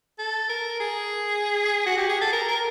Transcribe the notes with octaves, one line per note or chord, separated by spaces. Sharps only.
A4
A#4
G#4
F#4
G4
G#4
A4
A#4
A#4